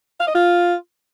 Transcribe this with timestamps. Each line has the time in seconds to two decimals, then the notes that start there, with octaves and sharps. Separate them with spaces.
0.20 F5
0.28 D#5
0.35 F4